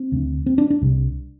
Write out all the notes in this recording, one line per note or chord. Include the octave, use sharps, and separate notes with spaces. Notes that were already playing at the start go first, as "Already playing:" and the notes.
Already playing: C4
D2 D3
C4
D4
D4
C2 C3